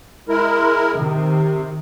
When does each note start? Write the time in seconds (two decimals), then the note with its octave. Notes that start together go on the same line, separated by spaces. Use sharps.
0.29 G#3 E4 A#4
0.95 C3 D#3